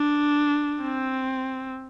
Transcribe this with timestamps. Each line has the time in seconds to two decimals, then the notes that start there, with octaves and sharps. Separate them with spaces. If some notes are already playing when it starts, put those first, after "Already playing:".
Already playing: D4
0.81 C4